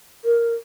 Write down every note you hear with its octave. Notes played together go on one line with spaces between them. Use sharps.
A#4